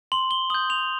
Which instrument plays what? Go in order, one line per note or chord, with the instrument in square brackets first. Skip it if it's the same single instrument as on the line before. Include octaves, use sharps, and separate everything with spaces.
[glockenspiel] C6 F#7
G7
D#6 G6 F#7
F7